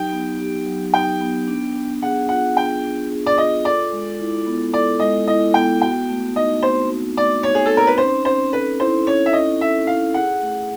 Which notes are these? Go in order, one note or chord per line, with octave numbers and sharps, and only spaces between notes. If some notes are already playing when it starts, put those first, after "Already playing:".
Already playing: F#3 D#4 G4 G5
B3
G4
F#3
D#4 G5
B3
D4
D4
G#4 F#5
F4 F#5
D4 G5
D4
G#4
D5
F4 D#5
A4 D5
G#3
E4
B3
A4 D5
G#3 D#5
E4 D#5
B3 G5
F#4 G5
A3
D#4 D#5
C4 C5
F#4
A3 D5
D#4 C#5
G#4
A4
C4
A#4
B4
C#4 C5
C#4 C5
A4 B4
E4 C5
C#4 C#5
E5
C#4 D#5
A4 E5
E4 F5
G#4 F#5
A3